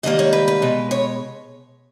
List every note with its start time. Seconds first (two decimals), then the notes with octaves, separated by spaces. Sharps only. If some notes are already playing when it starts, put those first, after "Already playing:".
0.03 G#2 D#3 G3 A#3 D#5
0.19 C#5
0.33 B4
0.48 B4
0.62 B2 G#3
0.91 C#5